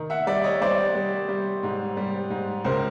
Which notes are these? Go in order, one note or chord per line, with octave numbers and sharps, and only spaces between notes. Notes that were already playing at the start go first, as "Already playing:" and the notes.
Already playing: D#3
E5 F#5
G3 D5 E5
C#5 D#5
G3 C5 D5
G3
G3
G#2
G3
G#2
C#2 A#4 C5